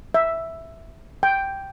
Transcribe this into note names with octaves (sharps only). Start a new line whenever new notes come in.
E5
G5